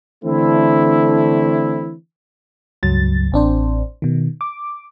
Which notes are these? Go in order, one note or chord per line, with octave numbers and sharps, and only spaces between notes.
D3 E3 A3 C4 D4 E4
C#2 G2 F#3 A6
A1 C4 D4 C5
B2 D#3
D6